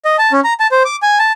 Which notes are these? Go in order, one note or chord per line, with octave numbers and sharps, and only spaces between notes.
D#5
A5
C#4
A#5
A5
C5
D6
G#5
A5